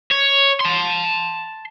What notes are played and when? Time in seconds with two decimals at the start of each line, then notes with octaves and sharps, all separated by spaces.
0.11 C#5
0.61 A5 C6